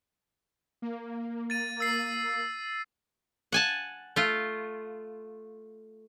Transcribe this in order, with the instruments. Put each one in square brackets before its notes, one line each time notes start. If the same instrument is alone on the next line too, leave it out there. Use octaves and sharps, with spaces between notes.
[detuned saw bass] A#3
[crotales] A6 D#7
E6 C7
[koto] F#5 G#5 A5
A3 F4